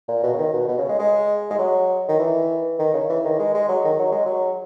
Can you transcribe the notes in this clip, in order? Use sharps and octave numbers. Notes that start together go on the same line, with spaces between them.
A#2
B2
C#3
D#3
B2
B2
C#3
G#3
G#3
G#3
F#3
D#3
E3
D#3
C#3
E3
D#3
G#3
G#3
F#3
D#3
F#3
G#3
F#3